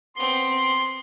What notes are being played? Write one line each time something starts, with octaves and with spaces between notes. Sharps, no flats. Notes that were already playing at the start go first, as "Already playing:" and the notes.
B3 C4 C6